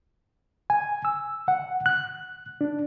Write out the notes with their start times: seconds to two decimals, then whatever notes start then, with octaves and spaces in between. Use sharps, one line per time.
0.70 G#5
1.05 E6
1.48 F#5
1.86 F#6
2.61 D4